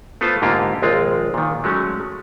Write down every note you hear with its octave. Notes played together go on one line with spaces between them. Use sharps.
A3 B3 F4 A4 C5 A5
G#2 D3 A#3 F4 G4
A#1 D#2 G#3 C4 F4
A#2 D#3
F#3 G#3 A3 C#4